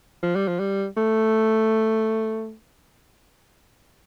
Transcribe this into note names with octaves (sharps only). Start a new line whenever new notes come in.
F3
G3
F3
G3
A3